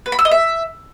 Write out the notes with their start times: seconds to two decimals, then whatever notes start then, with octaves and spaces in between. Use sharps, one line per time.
0.06 B4
0.12 B5
0.19 E6
0.25 D#5
0.31 E5